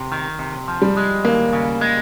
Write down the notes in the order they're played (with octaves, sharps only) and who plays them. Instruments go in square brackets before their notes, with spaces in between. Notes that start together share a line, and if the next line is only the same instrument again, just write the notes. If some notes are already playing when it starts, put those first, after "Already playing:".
Already playing: [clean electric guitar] C3
D#3
C3
F3
[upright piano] G3
[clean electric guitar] G#3
[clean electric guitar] D#2 [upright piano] A#3
[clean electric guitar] C#3
G#3